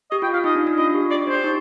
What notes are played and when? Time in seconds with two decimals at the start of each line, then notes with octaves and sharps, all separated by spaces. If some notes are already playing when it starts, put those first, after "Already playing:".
0.11 G4 D#5
0.22 F4 G5
0.33 F4 F5
0.44 D#4 D#5
0.55 D4
0.67 D4
0.77 F4 D#5
0.94 G4
1.11 G4 D5
1.27 D4 C5
1.35 G4
1.44 D#4